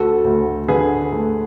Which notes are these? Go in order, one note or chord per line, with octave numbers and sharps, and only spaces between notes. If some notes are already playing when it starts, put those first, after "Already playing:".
Already playing: D2 F#4 A4
D2
D3 G#4 B4
A3